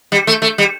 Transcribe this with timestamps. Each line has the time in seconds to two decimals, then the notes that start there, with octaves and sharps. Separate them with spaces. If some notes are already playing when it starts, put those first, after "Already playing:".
0.12 G3
0.27 A3
0.42 A3
0.58 G3